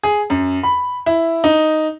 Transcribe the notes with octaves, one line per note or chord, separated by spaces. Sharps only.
G#4
F#2
B5
E4
D#4